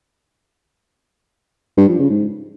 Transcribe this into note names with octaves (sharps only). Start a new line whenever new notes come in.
G2
F3
C#3
G#2